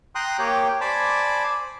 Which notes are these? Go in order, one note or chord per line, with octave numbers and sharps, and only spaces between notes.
G5 A#5 C6 D#6 F#6
A#3 G4 C#5 G5
C5 D5 G#5 A5 B5 D6